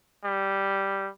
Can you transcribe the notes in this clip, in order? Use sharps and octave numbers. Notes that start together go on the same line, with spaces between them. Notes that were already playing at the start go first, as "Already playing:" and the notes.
G3